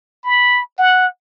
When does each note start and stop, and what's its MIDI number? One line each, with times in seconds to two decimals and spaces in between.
0.24 0.61 83
0.79 1.06 78